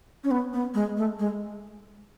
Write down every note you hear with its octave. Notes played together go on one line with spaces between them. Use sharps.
C#4
B3
B3
G#3
A3
G#3